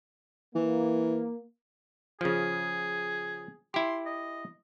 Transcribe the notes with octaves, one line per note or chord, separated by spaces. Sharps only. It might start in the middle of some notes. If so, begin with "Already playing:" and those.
E3 A#3
C#3 F3 G#4
E4 G4 C6
D#5